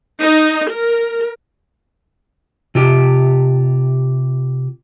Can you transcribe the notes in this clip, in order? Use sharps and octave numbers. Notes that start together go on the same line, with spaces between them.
D#4
A#4
C3 F4 G4